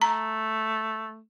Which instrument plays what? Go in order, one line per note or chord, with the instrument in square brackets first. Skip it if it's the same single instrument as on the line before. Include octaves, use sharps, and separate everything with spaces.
[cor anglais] A3 [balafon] A#5